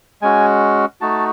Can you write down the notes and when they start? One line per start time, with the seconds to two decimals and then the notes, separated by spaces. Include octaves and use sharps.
0.22 G#3 C#4 F#4 G#5
1.01 A3 D#4 F#4 A5